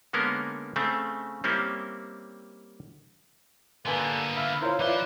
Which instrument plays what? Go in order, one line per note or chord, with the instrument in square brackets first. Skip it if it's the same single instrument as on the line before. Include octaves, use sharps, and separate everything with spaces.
[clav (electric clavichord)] D3 G#3 A#3 B3 C#4 A#4
C#3 A3 C4
G3 A#3 C4 C#4 E4
[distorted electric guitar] D3 B3 [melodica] G3 A4 [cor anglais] A#3 [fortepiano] B4 G#5 C6
[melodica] E5 F5 B5
[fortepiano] E4 F4 C#5 [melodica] A#4 C5
[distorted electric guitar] F3 C6 [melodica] E4 B4 [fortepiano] F4 C#5 [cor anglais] D5